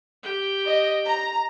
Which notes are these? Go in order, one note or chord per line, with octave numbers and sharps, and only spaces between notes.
G4 G5
D#5
A#5